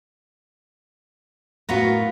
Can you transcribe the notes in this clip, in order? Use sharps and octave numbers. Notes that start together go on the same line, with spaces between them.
A2 B3 F4 F#4 A#4